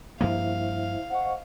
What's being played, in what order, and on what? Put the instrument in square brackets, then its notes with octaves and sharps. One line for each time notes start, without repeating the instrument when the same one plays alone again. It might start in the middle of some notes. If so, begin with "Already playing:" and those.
[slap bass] G2 F3 A#3 [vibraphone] E4 C5 E5 [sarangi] F5
[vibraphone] C5 D#5 C#6 [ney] F#5